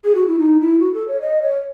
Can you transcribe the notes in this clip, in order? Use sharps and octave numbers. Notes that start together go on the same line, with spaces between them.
G#4
F#4
E4
D#4
E4
F#4
A4
C#5
D#5
C#5